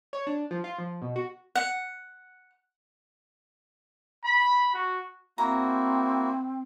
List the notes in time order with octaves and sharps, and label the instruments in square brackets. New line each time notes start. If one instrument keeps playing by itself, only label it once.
[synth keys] C#5
D4
F3
F4
F3
B2
F#4
[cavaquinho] F#5
[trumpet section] B5
F#4
[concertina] A#3 E4 F#4 [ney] C4 [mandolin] A#5